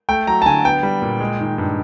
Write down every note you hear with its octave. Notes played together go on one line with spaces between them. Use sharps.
A3 G5
F#3 A#5
A5
D3 G#5
B3 G5
G3
A#2
G#3
D#3
G2